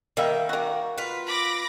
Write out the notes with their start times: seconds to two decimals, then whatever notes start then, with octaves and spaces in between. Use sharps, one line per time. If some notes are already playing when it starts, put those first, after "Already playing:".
0.17 D#3 G3 A#3 E5
0.49 A#3 F#4
0.98 F4 B4
1.27 B5 D6 A#6